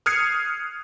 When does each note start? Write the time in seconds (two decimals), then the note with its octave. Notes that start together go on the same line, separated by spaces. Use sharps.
0.06 D#6 F6 F#6 G#6 C7 C#7